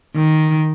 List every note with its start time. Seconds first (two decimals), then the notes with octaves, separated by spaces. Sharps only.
0.15 D#3